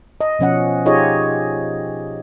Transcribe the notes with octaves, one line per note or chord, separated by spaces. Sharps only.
D#5
B2 F3 C#4 F#5
D#4 F4 G4 G#4 C#5 D#5